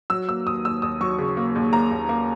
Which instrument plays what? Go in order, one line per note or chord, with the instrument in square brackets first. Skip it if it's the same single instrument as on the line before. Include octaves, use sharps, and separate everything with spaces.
[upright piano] F#3 E6
A#3 E6
D#2 D#6
D#2 E6
D#2 D#6
F#3 C#6
C#3
A#3
D#2
A#3 A#5
D#2
A#3